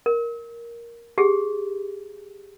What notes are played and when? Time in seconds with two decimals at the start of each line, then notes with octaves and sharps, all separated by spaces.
0.06 A#4
1.18 G4 G#4